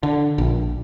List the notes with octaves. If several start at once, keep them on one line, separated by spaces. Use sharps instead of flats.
D3
A#1